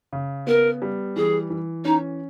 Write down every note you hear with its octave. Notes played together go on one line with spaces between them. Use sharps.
C#3
B3 A#4
G3
E3 G#4
E3
C#4 D#4